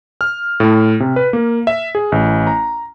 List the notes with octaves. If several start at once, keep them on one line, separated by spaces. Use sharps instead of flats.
F6
A2
C3
B4
A#3
E5
G#4
A1
A#5